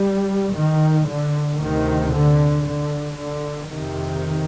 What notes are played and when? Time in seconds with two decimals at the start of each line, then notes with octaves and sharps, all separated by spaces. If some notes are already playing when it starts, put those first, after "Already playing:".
Already playing: G3
0.55 D#3
1.07 D3
1.60 D2 C3 D#3
2.13 D3
2.66 D3
3.18 D3
3.71 F2 C3 D#3